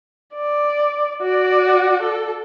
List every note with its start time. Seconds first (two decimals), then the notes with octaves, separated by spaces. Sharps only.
0.34 D5
1.22 F#4 D5
2.03 A4